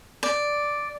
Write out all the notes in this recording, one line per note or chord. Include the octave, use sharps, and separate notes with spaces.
D5